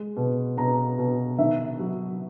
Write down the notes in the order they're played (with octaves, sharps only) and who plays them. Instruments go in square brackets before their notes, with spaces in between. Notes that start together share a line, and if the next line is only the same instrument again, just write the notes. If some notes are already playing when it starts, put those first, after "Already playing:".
Already playing: [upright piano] G#3
B2
B2 A#5
B2
D#3 E5
F#3